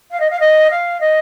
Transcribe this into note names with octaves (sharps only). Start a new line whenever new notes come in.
F5
D#5
F5
D#5
F5
D#5